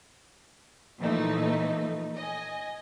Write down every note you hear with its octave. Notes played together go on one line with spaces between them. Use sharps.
A#2 E3 F3 A3 D#4
D#5 G#5